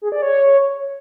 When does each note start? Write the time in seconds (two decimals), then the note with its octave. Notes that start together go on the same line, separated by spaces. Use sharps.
0.02 G#4
0.12 D5
0.22 C#5